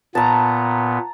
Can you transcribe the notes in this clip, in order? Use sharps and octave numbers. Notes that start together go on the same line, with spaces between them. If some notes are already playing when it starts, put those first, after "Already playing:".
A#2 B3 A5 A#5